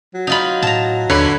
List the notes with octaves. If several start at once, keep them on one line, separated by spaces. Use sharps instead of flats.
F#3
D#4 F4 B5
A2 A5 A#5
D#2 D3 B4 C#5 B5